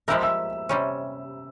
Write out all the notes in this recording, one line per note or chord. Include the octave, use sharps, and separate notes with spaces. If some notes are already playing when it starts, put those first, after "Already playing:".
F3 G#3 E4 G4 A#4 E5 E6
E5 E6
C3 G3 C#4